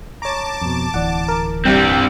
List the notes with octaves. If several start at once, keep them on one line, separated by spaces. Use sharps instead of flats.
C#5 A5 A#5 D6
F2 B2
D1 E3 D5 F#5
A#4
G2 G3 C4 G4 G5